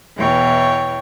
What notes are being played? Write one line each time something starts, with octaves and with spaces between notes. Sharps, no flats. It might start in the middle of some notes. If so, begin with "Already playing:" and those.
E2 B2 E3 C#5 G5